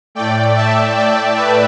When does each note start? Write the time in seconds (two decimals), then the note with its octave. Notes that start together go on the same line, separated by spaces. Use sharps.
0.15 A2 A3 D5 G5
0.56 E5 A5
0.95 D5 G5
1.36 B4 E5